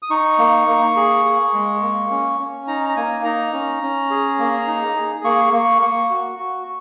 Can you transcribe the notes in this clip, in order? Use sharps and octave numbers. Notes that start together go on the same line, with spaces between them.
D#6
D#4 C#6
A#3
A#3
G#4
G#4
G#3
A#3
C#4
C#4
D#4 A#5
A#5
A#3 G#5
D#4 A#5
C#4
C#4
G#4
A#3
D#4
G#4
A#3 C#6
A#3 C#6
A#3 C#6
F#4
F#4